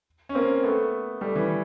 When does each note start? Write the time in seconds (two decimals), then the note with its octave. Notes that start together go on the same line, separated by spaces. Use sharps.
0.29 C#4
0.35 A#3 C4
0.63 A3 B3
1.21 G3 A3
1.35 E3